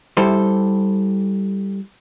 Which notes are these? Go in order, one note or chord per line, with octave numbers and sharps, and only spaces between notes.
G3 E4 A4 C5